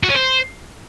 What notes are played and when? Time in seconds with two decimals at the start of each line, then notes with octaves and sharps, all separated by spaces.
0.03 F#4
0.09 C#4
0.15 C5